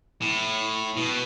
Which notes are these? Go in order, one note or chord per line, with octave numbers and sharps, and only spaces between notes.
A2
B2